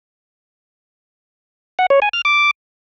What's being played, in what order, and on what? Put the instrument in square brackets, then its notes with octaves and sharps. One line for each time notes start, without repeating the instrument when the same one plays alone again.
[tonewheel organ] F#5
C#5
G#5
F6
D6